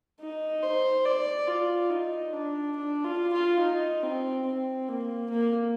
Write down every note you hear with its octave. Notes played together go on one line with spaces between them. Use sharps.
D#4
C5
D5
F4
D#4
D4
D4
F4
F4
D#4
C4
C4
A#3
A#3